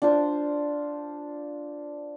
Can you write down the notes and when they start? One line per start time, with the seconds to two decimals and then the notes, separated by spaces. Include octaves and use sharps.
0.02 D4 F4 C5